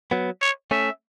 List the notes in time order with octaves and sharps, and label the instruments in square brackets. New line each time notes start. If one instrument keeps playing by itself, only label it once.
[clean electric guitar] F#3 B3
[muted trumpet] C#5
[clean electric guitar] A3 C#4 [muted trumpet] E5